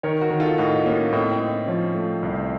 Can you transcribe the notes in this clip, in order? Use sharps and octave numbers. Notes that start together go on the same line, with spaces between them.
D#3 A#4 C#5
F#4 A#4
D#3
F4 A4
A2 D#4 F#4
A#3 C#4 F4
A2 C4 D#4
C4 D#4
A2
D#4
C#4
F3 C#4 F4
A3
C2